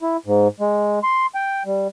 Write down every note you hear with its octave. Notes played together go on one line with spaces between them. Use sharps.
E4
G#2
G#3
C6
G5
G3